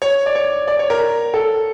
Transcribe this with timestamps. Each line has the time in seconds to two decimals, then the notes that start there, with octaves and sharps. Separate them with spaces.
0.02 C#5
0.26 D5
0.35 C#5
0.68 D5
0.79 C#5
0.90 A#4
1.34 A4